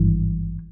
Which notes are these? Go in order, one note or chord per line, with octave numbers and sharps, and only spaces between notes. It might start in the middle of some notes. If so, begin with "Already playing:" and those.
Already playing: G#1 G2 E3